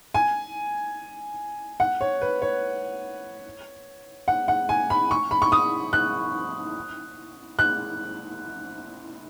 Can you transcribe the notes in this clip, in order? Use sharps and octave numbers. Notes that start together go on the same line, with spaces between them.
G#5
F#5
C#5
B4
C#5
F#5
F#5
G#5
B5
C#6
B5
C#6
D#6
F#6
F#6